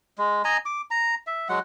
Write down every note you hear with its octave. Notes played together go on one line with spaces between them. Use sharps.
G#3
D#5 G#5 A#5
D6
A#5
E5
F#3 G#3 F#5